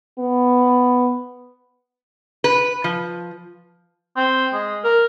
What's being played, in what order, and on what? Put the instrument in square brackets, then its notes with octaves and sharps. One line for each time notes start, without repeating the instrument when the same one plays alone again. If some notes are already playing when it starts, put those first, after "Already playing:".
[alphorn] B3
[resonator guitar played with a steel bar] B4
F3
[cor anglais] C4
G#3
A#4